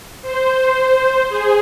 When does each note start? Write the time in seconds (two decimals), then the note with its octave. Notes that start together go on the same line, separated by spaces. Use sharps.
0.22 C5
1.29 G#4